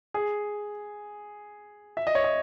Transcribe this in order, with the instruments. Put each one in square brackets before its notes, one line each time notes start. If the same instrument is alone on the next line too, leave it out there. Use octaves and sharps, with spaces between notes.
[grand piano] G#4
E5
D#5
C#5
D#5